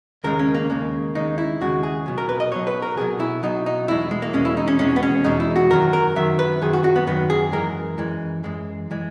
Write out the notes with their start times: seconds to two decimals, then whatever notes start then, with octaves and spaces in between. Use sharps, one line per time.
0.24 D#2 C#3 G#3 A#4
0.39 C#4
0.55 A#3
0.70 D#2 C#3 G#3
1.15 D#2 C#3 G#3 D#4
1.38 E4
1.61 D#2 C#3 G#3 F#4
1.83 G#4
2.06 B1 B2 F#3
2.18 A#4
2.29 B4
2.40 D#5
2.52 B1 B2 F#3 C#5
2.67 B4
2.82 A#4
2.97 B1 B2 F#3 G#4
3.20 E4
3.43 B1 B2 F#3 D#4
3.66 D#4
3.88 E2 B2 G#3 E4
4.11 G#3
4.22 A#3
4.33 E2 B2 G#3 C#4
4.45 E4
4.57 D#4
4.68 C#4
4.79 E2 B2 G#3 C#4
4.96 B3
5.03 C#4
5.24 E2 B2 G#3 D#4
5.40 E4
5.56 F#4
5.70 F#2 D#3 F#3 A#4
5.93 A#4
6.16 F#2 D#3 F#3 E5
6.39 B4
6.62 F#2 D#3 F#3 G#4
6.73 F#4
6.84 F#4
6.96 B3
7.07 F#2 D#3 F#3 B3
7.30 G#4
7.52 F#2 E3 G#3 A#4
7.98 F#2 E3 G#3
8.44 F#2 E3 G#3
8.91 E3 G#3